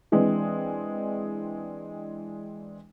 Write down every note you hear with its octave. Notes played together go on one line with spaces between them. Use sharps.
E3 G#3 C4 D4